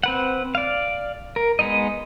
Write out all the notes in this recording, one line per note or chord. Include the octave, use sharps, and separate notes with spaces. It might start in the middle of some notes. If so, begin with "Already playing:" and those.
C4 B4 F#5
D5 F5
A#4
G#3 B3 D#4 D#5